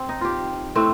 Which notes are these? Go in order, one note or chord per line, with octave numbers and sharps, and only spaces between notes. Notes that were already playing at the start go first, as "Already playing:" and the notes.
Already playing: C4
D#4
F4 G4
A2 A3 C4